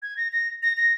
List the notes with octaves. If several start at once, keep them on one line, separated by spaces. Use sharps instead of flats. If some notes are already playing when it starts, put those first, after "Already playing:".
G#6
A#6
A#6
A#6
A#6